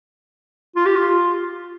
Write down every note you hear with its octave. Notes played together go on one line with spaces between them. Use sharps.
F4
G4
F4